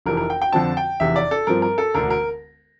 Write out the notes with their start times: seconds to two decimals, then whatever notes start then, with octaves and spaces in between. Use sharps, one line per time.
0.06 F1 F2 C3 E3 A#4
0.17 A#4
0.30 G5
0.42 G5
0.53 F2 D3 F3 C4 A5
0.77 G5
1.00 F1 E2 C3 E5
1.16 D5
1.31 A4
1.47 G2 F3 C4 A#4
1.62 A#4
1.78 A4
1.94 E1 D2 D3 A#4
2.10 A#4